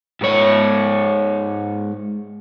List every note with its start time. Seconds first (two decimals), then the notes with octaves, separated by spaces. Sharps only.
0.21 G#2 C#5